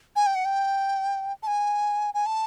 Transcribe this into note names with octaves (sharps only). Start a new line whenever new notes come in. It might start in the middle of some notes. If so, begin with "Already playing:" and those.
G#5
G5
F#5
G5
A5
G#5
G#5
A5